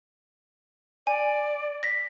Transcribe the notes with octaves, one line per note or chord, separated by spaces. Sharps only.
D5 G#5
A#6 B6